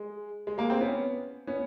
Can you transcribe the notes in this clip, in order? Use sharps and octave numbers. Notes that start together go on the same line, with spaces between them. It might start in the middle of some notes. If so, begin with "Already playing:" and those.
Already playing: G#3
G#3
G#3 A#3
A#3 C4
B3 C#4
B3 C#4